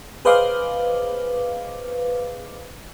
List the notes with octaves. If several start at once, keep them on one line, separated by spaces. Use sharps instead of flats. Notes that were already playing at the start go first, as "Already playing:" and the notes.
G#4 B4 C5 D#5 F5 D6